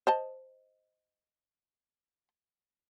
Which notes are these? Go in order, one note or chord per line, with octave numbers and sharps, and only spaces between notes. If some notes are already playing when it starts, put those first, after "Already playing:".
C5 D#5 A5